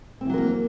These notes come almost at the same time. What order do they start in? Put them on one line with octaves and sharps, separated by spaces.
C4 E3 F#3 A#4 A#3